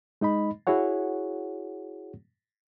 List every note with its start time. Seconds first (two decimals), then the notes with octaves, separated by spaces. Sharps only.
0.21 G#3 D#4 D#5 B5
0.67 E4 F#4 G#4 C#5 F#5